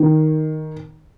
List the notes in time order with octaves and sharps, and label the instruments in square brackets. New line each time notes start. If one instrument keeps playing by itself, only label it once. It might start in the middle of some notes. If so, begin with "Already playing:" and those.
Already playing: [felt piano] D#3